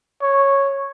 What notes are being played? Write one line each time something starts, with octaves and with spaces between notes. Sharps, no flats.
C#5